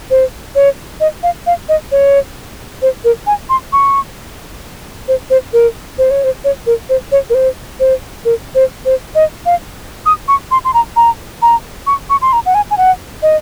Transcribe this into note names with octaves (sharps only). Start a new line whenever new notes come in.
C5
C#5
D#5
F5
F5
D#5
C#5
C5
A#4
G#5
C6
C#6
C5
C5
A#4
C5
C#5
C5
C#5
A#4
C5
C#5
A#4
C5
C5
A#4
C5
C5
D#5
F5
D#6
C#6
C6
C6
A#5
A#5
A#5
C#6
C#6
C6
A#5
F#5
G#5
G#5
F#5
D#5